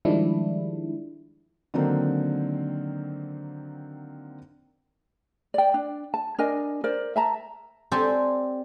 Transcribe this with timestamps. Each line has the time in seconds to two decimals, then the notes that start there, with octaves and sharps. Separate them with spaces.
0.05 D#3 F3 G3 G#3 D4 E4
1.74 D3 D#3 F#3 A#3 C4 D#4
5.54 D5 G5
5.74 D4
6.14 A5
6.39 D4 A#4 D#5 G#5
6.84 A#4 C5 D5
7.16 E5 A5 A#5
7.92 C4 G4 A4 C5 D5 G#5